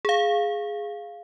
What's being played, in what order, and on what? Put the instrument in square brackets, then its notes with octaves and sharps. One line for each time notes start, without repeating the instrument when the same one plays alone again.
[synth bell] G#4 F5